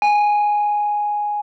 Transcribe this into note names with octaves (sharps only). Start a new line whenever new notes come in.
G#5